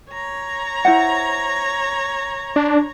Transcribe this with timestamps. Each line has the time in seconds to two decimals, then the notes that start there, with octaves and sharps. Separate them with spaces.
0.13 C#5 A#5
0.85 E4 C5 F#5
2.56 D4